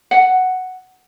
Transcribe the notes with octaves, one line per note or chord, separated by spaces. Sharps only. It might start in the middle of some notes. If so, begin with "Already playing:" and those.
F#5